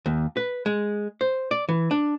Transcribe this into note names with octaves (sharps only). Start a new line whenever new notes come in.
D#2
B4
G#3
C5
D5
E3
D4